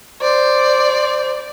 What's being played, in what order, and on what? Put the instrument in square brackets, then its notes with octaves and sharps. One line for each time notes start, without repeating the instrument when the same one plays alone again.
[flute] C5 [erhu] D5